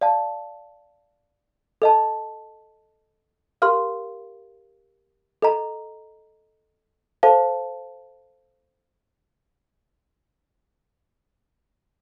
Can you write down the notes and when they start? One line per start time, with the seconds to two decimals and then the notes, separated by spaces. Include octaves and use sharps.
0.01 D5 F5 A5
1.82 A4 D#5 A5
3.62 G4 A#4 F5 C6 F6
5.42 A4 D#5 A#5
7.23 A4 C5 F5 A5